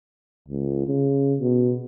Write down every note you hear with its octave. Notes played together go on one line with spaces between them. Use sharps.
C#2
C#3
B2